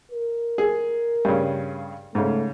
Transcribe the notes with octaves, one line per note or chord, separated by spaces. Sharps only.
A#4
G#4
G2 C#3
G#2 C#3 A3